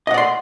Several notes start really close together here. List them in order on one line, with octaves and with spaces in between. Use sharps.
D#5 F#5 D5 C6